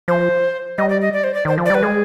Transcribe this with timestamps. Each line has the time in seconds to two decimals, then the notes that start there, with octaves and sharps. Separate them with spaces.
0.08 F3 C5
0.78 G3 D#5
0.89 D5
1.01 D#5
1.13 D5
1.24 C5
1.34 D5
1.45 D#3 C5
1.58 F3
1.66 D5
1.70 G3 B4
1.83 G#3 G#4